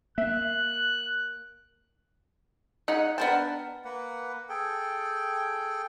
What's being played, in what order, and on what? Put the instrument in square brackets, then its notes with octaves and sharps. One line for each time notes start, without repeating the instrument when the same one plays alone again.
[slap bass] A#3 [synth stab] E5 [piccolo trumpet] F#6
[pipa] C#3 [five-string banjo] D#4 F#5
[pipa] B3 D4 G5 [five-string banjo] A#4 A5
[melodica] A#3 B4 F#5
G#4 A4 G5